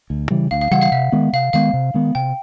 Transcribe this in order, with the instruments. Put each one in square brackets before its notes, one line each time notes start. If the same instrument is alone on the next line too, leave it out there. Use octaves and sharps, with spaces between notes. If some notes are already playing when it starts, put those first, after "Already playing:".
[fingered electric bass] D2
C#3 E3 G3
[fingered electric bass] D2 [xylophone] F5
[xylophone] F5
[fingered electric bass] C#3 E3 G3 [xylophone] F#5
[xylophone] F5
[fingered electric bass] C3 [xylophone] E5
[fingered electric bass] D#3 G#3 B3
[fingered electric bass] C3 [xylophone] F5
[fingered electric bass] D#3 G#3 B3 [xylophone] F5
[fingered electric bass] C3
D#3 G#3 B3
[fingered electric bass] C3 [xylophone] G5